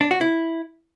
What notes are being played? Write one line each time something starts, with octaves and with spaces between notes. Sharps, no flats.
D4
F#4
E4